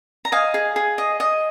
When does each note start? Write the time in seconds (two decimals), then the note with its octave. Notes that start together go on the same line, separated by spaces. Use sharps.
0.25 A#5
0.32 D#5 F5 G#5
0.54 G#4
0.76 G#4
0.98 D#5
1.20 D#5